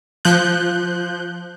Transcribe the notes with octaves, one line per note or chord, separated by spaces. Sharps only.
F3 F#6 G6